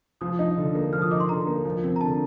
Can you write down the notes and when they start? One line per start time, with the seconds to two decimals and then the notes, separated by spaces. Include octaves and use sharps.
0.21 F3 D#6
0.39 D#4
0.57 D3
0.75 A#3
0.93 F3 F6
1.02 D#6
1.11 D#4 D6
1.20 C6
1.29 D3 A#5
1.47 A#3
1.65 F3
1.84 C4
1.96 A#5
2.01 D3 A5